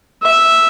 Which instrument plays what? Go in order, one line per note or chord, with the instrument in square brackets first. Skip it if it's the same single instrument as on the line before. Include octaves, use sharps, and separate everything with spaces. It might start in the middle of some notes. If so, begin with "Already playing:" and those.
[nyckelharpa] E5